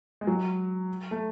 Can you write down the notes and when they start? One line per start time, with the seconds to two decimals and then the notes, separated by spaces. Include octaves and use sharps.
0.21 G#3
0.27 F#3
1.11 A3